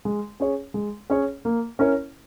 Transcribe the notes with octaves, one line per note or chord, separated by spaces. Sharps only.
G#3
C#4 G#4 C#5
G#3
C#4 G#4 C#5
A#3
C#4 E4 A#4 C#5